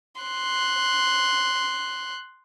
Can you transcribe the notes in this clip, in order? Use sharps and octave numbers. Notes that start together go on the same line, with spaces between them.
C6 F#6